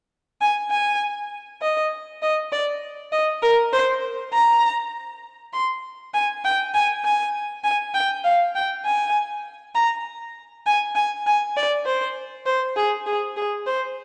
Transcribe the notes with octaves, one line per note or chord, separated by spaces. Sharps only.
G#5
G#5
D#5
D#5
D5
D#5
A#4
C5
A#5
C6
G#5
G5
G#5
G#5
G#5
G5
F5
G5
G#5
A#5
G#5
G#5
G#5
D5
C5
C5
G#4
G#4
G#4
C5